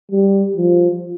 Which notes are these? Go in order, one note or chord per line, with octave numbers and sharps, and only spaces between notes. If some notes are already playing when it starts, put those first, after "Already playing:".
G3
F3